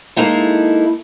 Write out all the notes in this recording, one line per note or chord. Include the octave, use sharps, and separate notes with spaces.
G#3 A#3 D#4 E4 A4